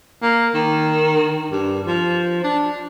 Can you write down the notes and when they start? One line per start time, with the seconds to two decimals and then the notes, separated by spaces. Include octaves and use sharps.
0.22 A#3
0.55 D#3
1.51 G2
1.87 F3
2.43 D4